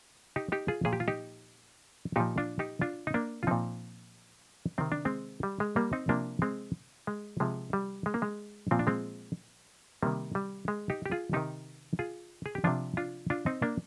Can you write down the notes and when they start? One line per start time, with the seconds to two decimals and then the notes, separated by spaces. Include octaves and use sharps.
0.36 D#4 G4
0.52 D#4 G4
0.68 F4 G#4
0.85 A#2 F3 G#4
0.93 G4
1.00 F4
1.08 D#4 G4
2.16 A#2 F3 D#4 G4
2.38 D4 F4
2.59 D#4 G4
2.81 D4 F4
3.07 D#4
3.14 A#3 D4
3.43 F4
3.47 A#2 F3 C4 D#4
4.78 C3 D#3 C4
4.92 D4
5.05 G#3 C4
5.43 G3
5.60 G#3
5.76 G3 A#3
5.93 C4 D#4
6.09 C3 F3 A#3 D4
6.42 G#3 C4
7.07 G#3
7.40 C3 F3 G#3
7.73 G3
8.06 G#3
8.14 A#3
8.22 G#3
8.71 A#2 F3 C4
8.79 D4
8.87 G#3 C4
10.03 C3 D#3 G3 A#3
10.35 G3
10.68 G#3
10.90 D#4 G4
11.06 G4
11.11 F4 G#4
11.33 C3 D#3 D#4 G4
11.99 F4 G#4
12.46 G#4
12.55 G4
12.64 C3 F3 D4 F4
12.97 D4 F4
13.30 D4 F4
13.46 C4 D#4
13.62 A#3 D4